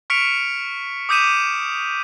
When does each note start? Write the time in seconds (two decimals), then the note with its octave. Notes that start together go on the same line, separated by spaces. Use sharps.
0.10 C#6 F6 B6 C#7 D7 F7
1.09 D6 D#6 G6 B6 D#7 E7